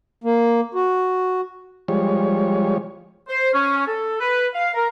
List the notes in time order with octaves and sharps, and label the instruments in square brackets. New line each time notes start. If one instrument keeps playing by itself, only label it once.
[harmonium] A#3
F#4
[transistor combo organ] F3 G3 G#3 C#5
[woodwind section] C5
C#4
A4
B4
F5
A#4